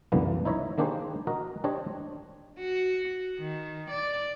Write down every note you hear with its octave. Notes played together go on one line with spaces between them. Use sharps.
C2 F#2 D3 E3 A#3 B3
D#4 E4 C#5 D#5 E5
D#3 A#3 D4 G4 G#4 C5
F#4 A#4 D#5
D4 G4 C5 C#5 D#5
F#4
D#3
D5